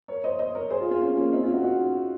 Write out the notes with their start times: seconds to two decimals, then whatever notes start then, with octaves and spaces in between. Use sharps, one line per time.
0.08 A#4 C#5
0.24 C5 D#5
0.39 C5 D#5
0.55 A#4 C#5
0.70 G#4 C5
0.81 F4 G#4
0.91 F4 G#4
1.01 C#4 F4
1.17 A#3 C#4
1.32 C4 D#4
1.43 C#4 F4
1.53 D#4 F#4
1.63 D#4 F#4